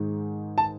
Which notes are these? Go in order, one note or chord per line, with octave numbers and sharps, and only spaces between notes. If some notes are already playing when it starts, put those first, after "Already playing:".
Already playing: G#2 D#3 G#3
A5